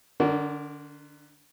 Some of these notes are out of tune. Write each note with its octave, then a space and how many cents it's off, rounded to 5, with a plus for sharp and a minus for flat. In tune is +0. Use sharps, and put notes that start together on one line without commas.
D3 +25 D4 -40 A#4 +0